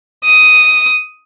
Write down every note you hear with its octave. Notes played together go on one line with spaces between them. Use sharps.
D#6